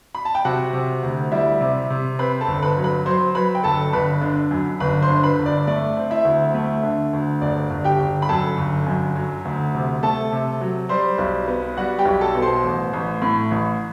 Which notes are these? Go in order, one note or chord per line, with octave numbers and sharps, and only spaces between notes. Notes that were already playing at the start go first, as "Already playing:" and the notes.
B5
A5
G5
C3 F#4 F#5
C3
D2
G3 E4 E5
C3
C3
C4 B4 B5
A4 A5
G1
B4 B5
F#3
B4 B5
F#3 C5 C6
F#3 B4 B5
G5
G1 A4 A5
G1 B4 B5
D3
F#2
G1 B4 B5
C5 C6
D3
B4 B5
G1
D5
A3 D5
C4
E4 E5
D2
A3
D3
D2
G1 D5
G1
G4 G5
G1
B5
F#2 A4 A5
G1
F#2
F#3
D2
C3
A3 A4 A5
C3
F#3
G3 C5 C6
B1
B3
G3 F#4 F#5
G4 G5
B1
A4 A5
B2
C5 C6
A1
A1
A2
A1